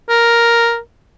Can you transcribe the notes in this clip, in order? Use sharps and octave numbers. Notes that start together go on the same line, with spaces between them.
A#4